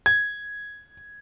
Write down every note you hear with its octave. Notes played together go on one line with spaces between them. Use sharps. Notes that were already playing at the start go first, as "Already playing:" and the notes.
G#6